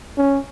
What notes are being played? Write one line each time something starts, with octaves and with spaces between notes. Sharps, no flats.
C#4